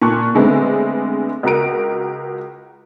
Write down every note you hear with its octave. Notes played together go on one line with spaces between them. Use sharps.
A#2 A5 C#6 F#6
D3 G#3 A3 B3 C4
C#2 F#4 A#4 D7